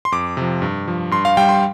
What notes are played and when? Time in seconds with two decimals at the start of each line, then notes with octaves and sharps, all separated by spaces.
0.05 C6
0.12 F2 D6
0.37 C3 F3
0.62 G2
0.88 F3
1.11 G2 C6
1.25 F5
1.37 G3 G5
1.49 C6